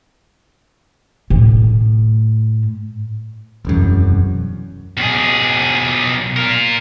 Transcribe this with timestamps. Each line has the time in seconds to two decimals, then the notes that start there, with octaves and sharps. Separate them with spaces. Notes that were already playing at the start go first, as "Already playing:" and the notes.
1.30 A2
3.65 E1 C2 F#2
4.97 B1 G#4
6.36 F4 A#4